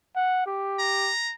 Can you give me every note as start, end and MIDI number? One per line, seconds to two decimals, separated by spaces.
0.16 0.46 78
0.47 1.11 67
0.79 1.33 82